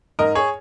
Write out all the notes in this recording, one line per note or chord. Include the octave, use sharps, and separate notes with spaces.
G#2 A#4 D#5
G#4 C#5